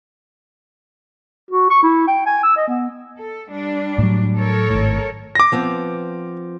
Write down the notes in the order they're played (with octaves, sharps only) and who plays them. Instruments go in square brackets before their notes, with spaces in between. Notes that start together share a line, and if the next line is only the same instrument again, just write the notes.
[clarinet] F#4
C#6
E4
G5
G#5
E6
D#5
B3
[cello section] A4
G3 D4
[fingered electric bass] A2 F#3
[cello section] A4 A#4 C#5
[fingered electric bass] G#1 A2
[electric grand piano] D6 A#6
[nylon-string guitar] F3 B3 C4